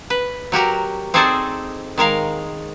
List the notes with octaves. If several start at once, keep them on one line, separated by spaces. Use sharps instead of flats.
B4
F#3 F#4 G4 A#4
C4 D#4 G#4 A4 C5 D5
D#3 G#3 A#4 F5